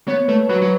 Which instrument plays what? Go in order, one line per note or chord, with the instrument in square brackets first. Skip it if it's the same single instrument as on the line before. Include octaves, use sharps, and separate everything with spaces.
[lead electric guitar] B3 [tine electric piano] C#5
[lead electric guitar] A3 [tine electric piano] B4
[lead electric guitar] F#3 [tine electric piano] B4
[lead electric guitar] F#3